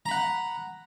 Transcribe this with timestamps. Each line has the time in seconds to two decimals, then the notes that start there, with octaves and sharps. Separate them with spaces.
0.06 A#5
0.08 B5
0.11 F#5